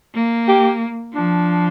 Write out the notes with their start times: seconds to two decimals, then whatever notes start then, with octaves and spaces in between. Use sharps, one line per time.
0.15 A#3
0.48 G4
1.15 F3 D4